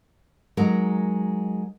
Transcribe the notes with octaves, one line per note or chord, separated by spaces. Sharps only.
F#3 G#3 D#4 A#4